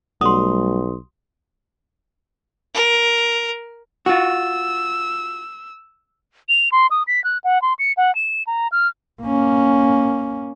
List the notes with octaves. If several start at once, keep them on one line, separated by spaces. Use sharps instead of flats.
B1 G3 A3 F#4 C6 D#6
A#4
F4 F#4 E6
F7
C6
D#6
B6
F#6
F#5
C6
C#7
F#5
E7
A#5
F6
A#3 C#4